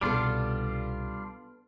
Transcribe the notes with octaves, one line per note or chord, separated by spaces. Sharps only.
C2 B2 G3 B3 D4 F4 A4